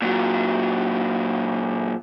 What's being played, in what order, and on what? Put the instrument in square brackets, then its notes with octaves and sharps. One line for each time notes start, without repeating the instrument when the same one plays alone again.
[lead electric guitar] A#2 F#3